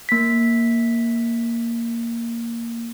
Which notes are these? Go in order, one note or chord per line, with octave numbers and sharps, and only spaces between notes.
A#3 B6